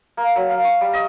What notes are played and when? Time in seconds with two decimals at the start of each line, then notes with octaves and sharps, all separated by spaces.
0.17 A#3
0.36 F#3
0.49 F5
0.64 C#6
0.81 G3
0.93 D#5